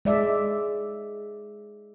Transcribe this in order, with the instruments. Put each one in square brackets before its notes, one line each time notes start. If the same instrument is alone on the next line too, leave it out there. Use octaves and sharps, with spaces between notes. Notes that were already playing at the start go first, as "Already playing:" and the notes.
[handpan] G#3 D5 E5